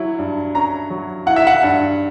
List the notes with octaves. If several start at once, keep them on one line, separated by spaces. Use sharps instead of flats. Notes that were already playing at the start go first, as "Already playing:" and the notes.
Already playing: F#3 E4
G2
C#4 A#5
F#3
E4 F#5
E5
F#5
G2